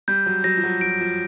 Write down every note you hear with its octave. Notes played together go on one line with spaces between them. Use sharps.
G3 G6
F#3
F#3 A#6
F3
F#3
F3 D7
F3